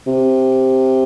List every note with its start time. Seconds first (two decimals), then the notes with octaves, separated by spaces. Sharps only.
0.07 C3